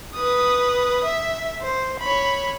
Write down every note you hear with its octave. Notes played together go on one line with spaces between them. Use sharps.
B4 D#6
E5
C5
C#5 B5